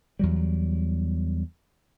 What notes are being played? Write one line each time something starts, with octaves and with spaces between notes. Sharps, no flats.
E2 F#3 G3